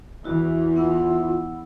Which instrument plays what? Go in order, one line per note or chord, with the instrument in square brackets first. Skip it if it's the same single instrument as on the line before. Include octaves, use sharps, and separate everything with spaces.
[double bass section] E2 E3 [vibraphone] E4 F#4
[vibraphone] B3 F#5 E6 [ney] F4